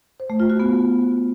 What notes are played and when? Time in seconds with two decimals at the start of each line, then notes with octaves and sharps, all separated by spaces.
0.20 C5
0.30 A3
0.40 F4
0.50 F#4
0.60 B3